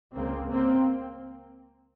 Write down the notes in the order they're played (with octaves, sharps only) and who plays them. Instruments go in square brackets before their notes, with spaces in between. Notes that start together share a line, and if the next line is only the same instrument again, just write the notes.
[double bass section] C#2 C#3 A#3 C4
A#3 C4